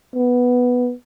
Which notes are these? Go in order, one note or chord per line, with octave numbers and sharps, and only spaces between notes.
B3